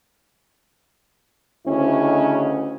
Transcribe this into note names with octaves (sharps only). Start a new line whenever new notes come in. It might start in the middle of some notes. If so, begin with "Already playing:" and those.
D2 C#3 C#4 E4 D#5